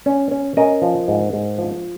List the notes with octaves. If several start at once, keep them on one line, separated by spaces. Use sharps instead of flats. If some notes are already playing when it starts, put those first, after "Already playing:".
C#4
C#4
C#4 A#4 D#5
F3
G#2
G#2
F3